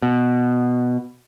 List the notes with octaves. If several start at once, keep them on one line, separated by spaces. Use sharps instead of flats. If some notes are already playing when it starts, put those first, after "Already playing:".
B2